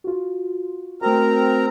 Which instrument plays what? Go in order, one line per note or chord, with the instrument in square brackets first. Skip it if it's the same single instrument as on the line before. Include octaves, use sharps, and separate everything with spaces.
[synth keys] F4 F#4
[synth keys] A3 F#4 [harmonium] C4 A#4 A#5